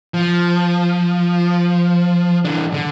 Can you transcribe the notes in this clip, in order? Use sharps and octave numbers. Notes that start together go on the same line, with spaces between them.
F3
E3 D4
D3